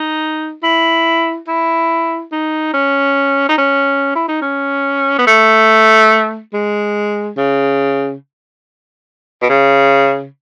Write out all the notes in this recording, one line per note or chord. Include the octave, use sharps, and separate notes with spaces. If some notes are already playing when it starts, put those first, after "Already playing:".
Already playing: D#4
E4
E4
D#4
C#4
D#4
C#4
E4
D#4
C#4
B3
A3
G#3
C#3
B2
C#3